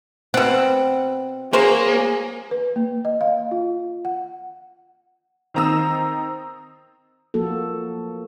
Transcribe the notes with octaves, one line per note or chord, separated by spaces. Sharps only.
B2 C4 F#5
F#3 A#3 G#4 C5 C#5
B4
A#3
D#5
F5
F4
F#5
D#3 C4 A#5 D#6 E6
F3 A#3 F#4 A4